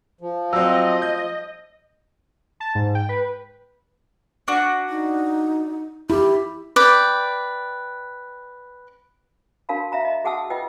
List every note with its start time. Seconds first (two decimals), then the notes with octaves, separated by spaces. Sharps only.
0.21 F3
0.53 F#3 C4 D5 D#5 E6
1.02 G6
2.60 A5
2.75 G#2
2.95 G5
3.09 B4
4.48 D4 F#4
4.89 D#4
6.10 E4 G4
6.76 B4 D5 G5
9.69 D4 F#4 A#4 F5 A5 B5
9.92 E5 F5 A#5 B5
10.05 D#5 A#5
10.24 F#4 G#4 F#5 A5 D#6 E6
10.50 F4 B4 D#5 G5 E6